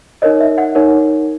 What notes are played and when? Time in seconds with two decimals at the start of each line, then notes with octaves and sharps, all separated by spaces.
0.22 D#4 A#4 C#5 D#5
0.40 E5
0.58 F#5
0.75 D#4 A#4 C#5